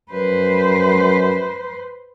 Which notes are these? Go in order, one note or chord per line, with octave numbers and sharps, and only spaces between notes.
F#2 B4 C5